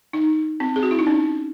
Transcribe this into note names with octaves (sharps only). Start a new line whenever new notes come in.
D#4
C4
G#4
F#4
E4
D#4
C#4